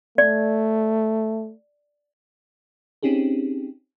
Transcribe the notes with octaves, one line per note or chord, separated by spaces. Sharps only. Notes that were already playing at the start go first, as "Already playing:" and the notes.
A3 D5
C4 C#4 D#4 G4 G#4